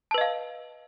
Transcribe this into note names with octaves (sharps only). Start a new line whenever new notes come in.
B4 D#5 F5 A5